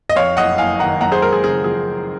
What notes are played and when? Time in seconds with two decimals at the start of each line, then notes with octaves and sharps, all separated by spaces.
0.09 D#5
0.16 F2 C#5 F5
0.37 F#1 D#5 F#5
0.58 F#1 F5 G#5
0.79 D#3 F#5 A#5
1.01 F#2 F#5 A#5
1.12 G#4 C5
1.22 G#3 A#4
1.33 G#4
1.44 C#3 G#4
1.64 F3 G#4